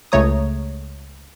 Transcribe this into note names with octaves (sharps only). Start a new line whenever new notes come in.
C#2 C#3 A3 C#5 A#5 D#6